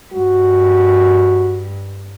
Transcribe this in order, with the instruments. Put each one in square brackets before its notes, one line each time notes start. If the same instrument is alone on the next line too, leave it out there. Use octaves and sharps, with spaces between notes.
[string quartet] G2 [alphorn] F#4